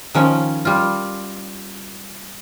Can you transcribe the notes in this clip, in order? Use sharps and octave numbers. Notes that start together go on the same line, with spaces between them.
D#3 F3 C#4
G3 F4